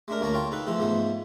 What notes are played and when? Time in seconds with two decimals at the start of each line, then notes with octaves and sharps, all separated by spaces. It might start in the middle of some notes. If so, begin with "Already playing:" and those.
0.08 G#3 A3 D4 A#4
0.21 D2 A#3 C#5 A5 A#5
0.34 F4 C#5 G5 A5
0.52 D#4 A4 B4
0.67 E3 F3 G#3 A3 A4
0.78 G#2 F3 G#3 A3 B3